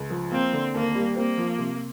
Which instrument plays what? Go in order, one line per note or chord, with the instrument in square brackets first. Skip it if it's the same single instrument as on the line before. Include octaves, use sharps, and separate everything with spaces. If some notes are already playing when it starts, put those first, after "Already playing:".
Already playing: [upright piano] C#2
F3
[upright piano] A#3 [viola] C4
[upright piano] D3
[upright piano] D#2 [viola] A#3
[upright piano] G3
[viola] A#3 [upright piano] C4
[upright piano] F3
C3